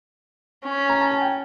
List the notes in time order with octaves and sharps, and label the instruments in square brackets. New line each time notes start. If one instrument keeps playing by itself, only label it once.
[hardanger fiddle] C#4
[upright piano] A#5
A5
G#5
G5